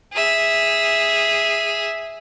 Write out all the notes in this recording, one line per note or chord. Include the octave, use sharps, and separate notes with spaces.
G#4 E5